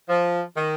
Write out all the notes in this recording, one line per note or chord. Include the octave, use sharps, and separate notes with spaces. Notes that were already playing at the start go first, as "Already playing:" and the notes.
F3
D#3